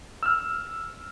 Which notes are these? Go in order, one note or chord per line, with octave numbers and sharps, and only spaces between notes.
E6 F6